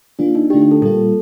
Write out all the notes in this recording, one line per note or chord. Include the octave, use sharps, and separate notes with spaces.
D#3 A#3 D4 F4
D#4
D3 A3 D4 F4 G4
G4
A4
A#2 G3 A#3 F4 A4